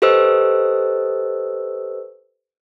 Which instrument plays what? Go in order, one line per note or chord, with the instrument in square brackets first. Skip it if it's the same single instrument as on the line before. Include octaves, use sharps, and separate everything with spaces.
[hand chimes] G4 A4 B4 C5 D#5 E6